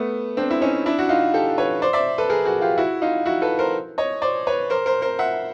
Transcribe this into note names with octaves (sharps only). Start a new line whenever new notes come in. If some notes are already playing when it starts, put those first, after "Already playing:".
Already playing: A3 B3
C4 D4
E4
C#4 D#4
D4 E4
F#4
D#4 F4
G4 A4
B4 C#5
C5 D5
D5 E5
A4 B4
G#4 A#4
F#4 G#4
F4 G4
E4 F#4
D#4 F4
E4 F#4
A4 B4
A#4 C5
C#5 D#5
C5 D5
B4 C#5
A#4 C5
A#4 C5
A#4 C5
E5 F#5